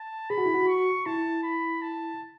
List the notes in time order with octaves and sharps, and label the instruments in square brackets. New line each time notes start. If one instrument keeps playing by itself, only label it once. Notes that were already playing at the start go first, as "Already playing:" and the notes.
Already playing: [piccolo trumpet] A5
[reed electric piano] G#4 [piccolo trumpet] B5
[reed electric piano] F#4
E4
F#4
[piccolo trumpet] C#6
[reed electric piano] E4 [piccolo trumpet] A5
[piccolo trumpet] B5
A5